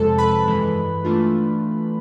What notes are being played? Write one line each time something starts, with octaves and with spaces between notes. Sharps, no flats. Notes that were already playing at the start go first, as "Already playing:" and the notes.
Already playing: F2 C3 F3 G#3 A4 A5
B4 B5
G2 E3 G#3
E3 A3 D4 F4